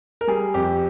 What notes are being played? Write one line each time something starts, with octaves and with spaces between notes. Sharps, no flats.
A#4
G3 G#4
F2 G4